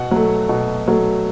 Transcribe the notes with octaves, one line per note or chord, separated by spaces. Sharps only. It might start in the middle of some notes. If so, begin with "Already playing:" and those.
Already playing: B2 F#5
F#3 A3
B2
F#3 A3